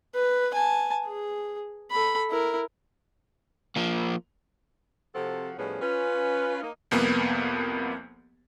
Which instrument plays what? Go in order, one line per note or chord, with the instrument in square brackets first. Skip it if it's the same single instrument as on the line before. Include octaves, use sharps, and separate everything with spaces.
[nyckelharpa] B4
G#5 A5
G#4
A4 B5
E4 A#4
[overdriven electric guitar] F3 A#3
[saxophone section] C3 F3 C4 F#4 A4
A2 F3 G3 B3 C#4 G#4
C#4 F4 B4
A#3 D#4
[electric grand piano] C2 F2 A#3 B3